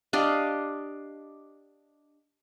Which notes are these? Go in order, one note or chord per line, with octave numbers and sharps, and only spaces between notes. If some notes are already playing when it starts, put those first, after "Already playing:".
D4 G4 D#5 F5